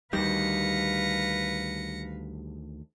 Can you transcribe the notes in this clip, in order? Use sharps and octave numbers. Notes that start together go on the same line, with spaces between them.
D2 D#3 G3 B4 F5 A#6 C#7